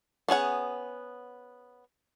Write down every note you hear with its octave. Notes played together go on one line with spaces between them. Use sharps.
B3 C#4 G#4 F#5